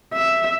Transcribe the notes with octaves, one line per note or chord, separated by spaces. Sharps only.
E5